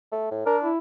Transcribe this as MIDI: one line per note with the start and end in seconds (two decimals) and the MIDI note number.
0.12 0.28 57
0.31 0.45 45
0.46 0.69 62
0.46 0.57 70
0.63 0.78 64